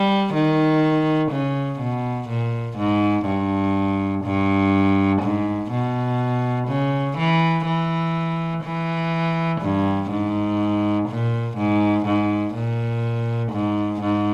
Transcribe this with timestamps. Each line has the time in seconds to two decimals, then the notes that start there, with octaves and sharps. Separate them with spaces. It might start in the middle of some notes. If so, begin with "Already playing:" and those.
Already playing: G3
0.34 D#3
1.32 C#3
1.80 B2
2.29 A#2
2.78 G#2
3.26 G2
4.24 G2
5.22 G#2
5.71 B2
6.68 C#3
7.18 E3
7.66 E3
8.64 E3
9.62 G2
10.10 G#2
11.09 A#2
11.58 G#2
12.06 G#2
12.55 A#2
13.52 G#2
14.02 G#2